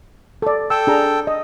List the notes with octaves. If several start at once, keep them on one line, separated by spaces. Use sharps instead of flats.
A4 D5
A4 G5 E6
D4 G#4 A#5
D#5